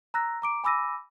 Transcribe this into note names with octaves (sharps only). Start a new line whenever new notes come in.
A#5 E6 F#6 A#6
A#5 D6 D7
G#5 B5 D6 E6 A#6 D#7